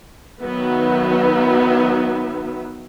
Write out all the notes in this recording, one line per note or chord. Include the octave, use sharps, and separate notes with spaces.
D#3 F#3 B3 D#4 B4 E5